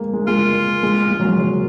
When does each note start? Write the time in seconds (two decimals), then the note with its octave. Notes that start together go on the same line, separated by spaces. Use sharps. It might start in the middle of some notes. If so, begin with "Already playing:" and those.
Already playing: G#3 A#3
0.13 G#3
0.27 G#3 F4
0.83 G#3
1.11 G#3
1.20 F#3
1.24 G#3
1.38 F#3